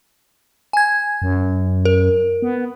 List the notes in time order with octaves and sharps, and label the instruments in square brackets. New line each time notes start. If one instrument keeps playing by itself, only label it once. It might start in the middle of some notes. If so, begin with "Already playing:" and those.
[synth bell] G#5 G#6
[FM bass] F#2
[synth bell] A#4
[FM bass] B3